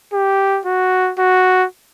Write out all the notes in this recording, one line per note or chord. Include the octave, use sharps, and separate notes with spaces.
G4
F#4
F#4